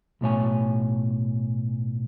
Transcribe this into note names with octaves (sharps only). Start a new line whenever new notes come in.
B1 A2 C#5 G#5